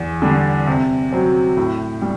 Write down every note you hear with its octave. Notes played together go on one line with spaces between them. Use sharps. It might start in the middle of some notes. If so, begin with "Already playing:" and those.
Already playing: E2
D3 G3 D4
C3
F#3 C4
A2
G3